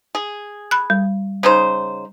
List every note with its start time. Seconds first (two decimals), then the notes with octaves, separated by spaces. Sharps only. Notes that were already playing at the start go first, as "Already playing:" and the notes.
0.15 G#4
0.71 B5 F#6
0.90 G3
1.43 C#3 D#4 C5